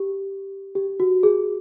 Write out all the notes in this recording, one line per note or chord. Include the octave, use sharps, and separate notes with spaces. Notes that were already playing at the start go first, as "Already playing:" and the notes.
Already playing: G4
G4
F#4
G#4